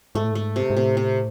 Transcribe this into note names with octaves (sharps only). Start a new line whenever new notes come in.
G#2 A3
A2
G#2 A3
C3
G#2
A2 C3
C3